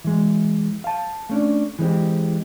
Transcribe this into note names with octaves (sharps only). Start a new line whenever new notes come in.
E3 G#3
F5 A5
A3 C#4 D4
E3 G#3 C4 G4